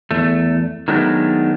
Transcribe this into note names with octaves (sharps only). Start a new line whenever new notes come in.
E2 A3
D#3 F#3 G#3 A3 B3 D4